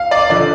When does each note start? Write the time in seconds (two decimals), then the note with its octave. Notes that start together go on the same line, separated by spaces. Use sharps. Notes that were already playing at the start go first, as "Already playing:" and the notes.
Already playing: F5
0.11 D5
0.30 D3 F3 D5